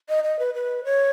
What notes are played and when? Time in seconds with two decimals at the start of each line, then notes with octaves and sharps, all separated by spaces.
0.09 D#5
0.24 D#5
0.39 B4
0.54 B4
0.85 C#5